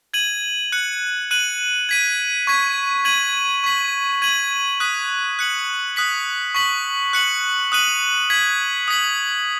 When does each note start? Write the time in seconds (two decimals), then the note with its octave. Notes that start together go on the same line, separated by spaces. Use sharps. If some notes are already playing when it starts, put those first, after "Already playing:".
0.14 G#6 D#7 F#7
0.72 F#6 C#7 F#7
1.31 F#6 D#7 F#7
1.89 G#6 B6 D#7
2.47 C#6 G#6 B6
3.05 G#6 D#7 F#7
3.64 C#6 B6 F#7
4.22 G#6 D#7 F#7
4.80 D#6 F#6 B6 D#7
5.39 F#6 C#7 F#7
5.96 D#6 F#6 B6 F#7
6.55 C#6 B6 F#7
7.13 F#6 C#7 F#7
7.72 D#6 F#6 D#7 F#7
8.30 G#6 B6 F#7
8.88 D#6 B6 F#7